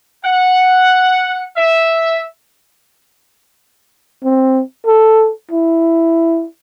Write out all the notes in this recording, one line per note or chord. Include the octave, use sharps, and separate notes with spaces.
F#5
E5
C4
A4
E4